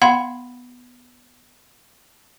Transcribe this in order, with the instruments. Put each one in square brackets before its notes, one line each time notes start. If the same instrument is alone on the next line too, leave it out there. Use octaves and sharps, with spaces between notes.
[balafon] B3 F5 F#5 B5 C6